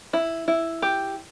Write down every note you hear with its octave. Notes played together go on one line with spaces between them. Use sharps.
E4
E4
G4